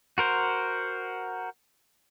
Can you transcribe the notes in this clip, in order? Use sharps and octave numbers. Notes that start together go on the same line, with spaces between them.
F#4 A#4 C5